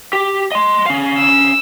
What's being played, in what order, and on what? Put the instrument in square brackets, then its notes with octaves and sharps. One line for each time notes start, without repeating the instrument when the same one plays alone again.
[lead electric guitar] G4
D#5 C6
C#4 F5
[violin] E6